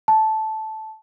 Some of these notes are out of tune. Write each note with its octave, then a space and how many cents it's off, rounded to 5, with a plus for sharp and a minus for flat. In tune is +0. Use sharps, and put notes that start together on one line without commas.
A5 -10